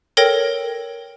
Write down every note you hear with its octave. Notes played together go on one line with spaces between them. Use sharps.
A4 A#4 C#5 G5 A#6